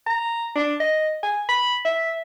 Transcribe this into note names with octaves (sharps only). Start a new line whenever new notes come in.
A#5
D4
D#5
G#5
B5
E5